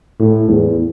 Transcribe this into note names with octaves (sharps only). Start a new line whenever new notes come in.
A2
E2